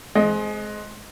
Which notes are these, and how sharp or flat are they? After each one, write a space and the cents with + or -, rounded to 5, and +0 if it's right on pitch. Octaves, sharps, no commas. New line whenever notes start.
G#3 +25 C4 +0 D#5 +0